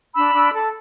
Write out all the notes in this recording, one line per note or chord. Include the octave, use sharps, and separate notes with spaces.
D4 B5 E6
D4
A4